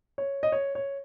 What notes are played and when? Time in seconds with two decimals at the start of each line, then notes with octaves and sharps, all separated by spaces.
0.18 C#5
0.43 D#5
0.52 C#5
0.75 C#5